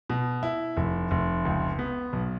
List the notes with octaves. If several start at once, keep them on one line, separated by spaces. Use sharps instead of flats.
B2
E4
F1
F1
C#2
B3
B1